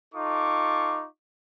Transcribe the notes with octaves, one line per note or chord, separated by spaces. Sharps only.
D#4 F4 A4 C#6 D6